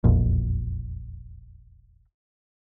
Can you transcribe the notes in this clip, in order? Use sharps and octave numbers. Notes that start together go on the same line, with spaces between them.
E1 A#1 F2